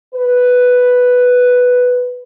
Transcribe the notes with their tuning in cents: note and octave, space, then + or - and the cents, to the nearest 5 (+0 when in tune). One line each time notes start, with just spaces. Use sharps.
B4 +0